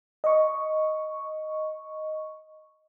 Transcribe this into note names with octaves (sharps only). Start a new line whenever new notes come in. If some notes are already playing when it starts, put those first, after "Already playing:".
D#5 C#6